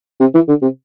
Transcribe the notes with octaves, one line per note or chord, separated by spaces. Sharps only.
C3
E3
D3
C3